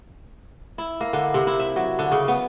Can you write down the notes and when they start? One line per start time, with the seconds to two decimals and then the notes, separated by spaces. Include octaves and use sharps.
0.78 E4
1.01 A#3
1.13 D3
1.34 C3
1.47 E4
1.59 E5
1.76 F#3
1.99 D3
2.12 C#3
2.28 B3